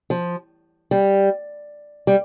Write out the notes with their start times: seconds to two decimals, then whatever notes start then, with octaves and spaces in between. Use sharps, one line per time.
0.10 F3
0.91 G3
2.07 G3